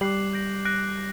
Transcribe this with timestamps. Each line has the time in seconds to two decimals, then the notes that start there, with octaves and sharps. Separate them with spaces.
0.01 G3 D6 F#6 C7 F#7
0.33 G6 A#6 D7 F#7
0.65 F#6 A#6 D7